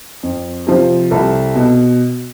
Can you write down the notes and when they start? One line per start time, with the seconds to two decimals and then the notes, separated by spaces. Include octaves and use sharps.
0.23 F2
0.67 C3 F3
1.11 C2 A4
1.55 B2